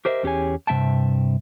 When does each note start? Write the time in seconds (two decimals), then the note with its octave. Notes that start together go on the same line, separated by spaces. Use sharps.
0.05 G4 A#4 C5 D#5 E5
0.23 E2 C#4 G4 G#4 C#5 G#5
0.67 G2 C3 B3 E5 G5 A5